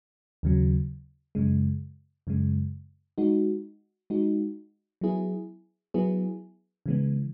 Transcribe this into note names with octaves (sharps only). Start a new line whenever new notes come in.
D#2 C#3 F#3
F#2 C#3 G#3
F#2 C#3 G#3
G#3 D#4 F#4
G#3 D#4 F#4
F#3 B3 E4 G#4
F#3 B3 E4 G#4
C#3 E3 G#3 B3